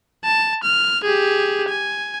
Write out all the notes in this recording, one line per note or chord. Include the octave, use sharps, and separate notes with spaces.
A5
F6
G4 G#4
G#5